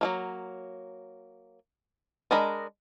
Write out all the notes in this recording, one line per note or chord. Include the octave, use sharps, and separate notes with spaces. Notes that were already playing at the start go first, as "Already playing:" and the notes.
F#3 A3 A#3
G#3 D4 A#4 D#5 B5